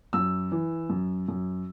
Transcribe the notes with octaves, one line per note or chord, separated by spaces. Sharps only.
F#2 E6
E3
F#2
F#2